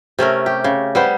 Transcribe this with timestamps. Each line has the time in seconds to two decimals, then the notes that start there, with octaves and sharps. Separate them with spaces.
0.19 C3 A3 C#4 A#4
0.46 G4
0.64 C#3
0.95 G3 B3 C5